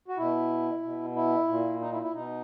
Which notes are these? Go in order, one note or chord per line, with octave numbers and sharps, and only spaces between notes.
F#4
B2 E4
B2
E4
A#2
D#4
E4
E4
B2 D#4